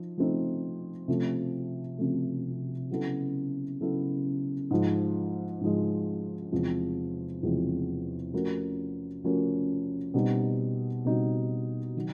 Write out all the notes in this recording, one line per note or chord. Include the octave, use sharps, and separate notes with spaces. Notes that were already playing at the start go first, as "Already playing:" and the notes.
Already playing: F3 D#4
F3 A3 C4 D#4
C3 F3 A3
C3 F3 A3
C#3 F#3 B3 E4 A4
C#3 F#3 B3 E4 A4
G#2 F3 G#3
G#2 F3 G#3
E2 C3 F3 G#3 C4
E2 C3 F3 G#3 C4
F3 A3 C#4 F#4 A#4
F3 A3 C#4 F#4 A#4
B2 G3 C4 D#4 F#4
B2 G3 C4 D#4 F#4
D#3 F#3